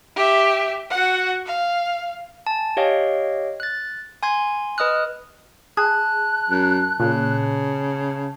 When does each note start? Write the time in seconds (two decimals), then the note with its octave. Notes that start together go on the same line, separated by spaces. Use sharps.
0.16 G4 E5
0.90 F#4 F#5
1.46 F5
2.47 G#5 A5
2.77 G4 C#5 D#5 F5 G5
3.60 F#6 A6
4.23 G#5 C6 G#6
4.78 B4 D#5 D#6 F6 F#6
5.77 G#4 A5 F#6
6.50 F#2
7.00 A#2 C#3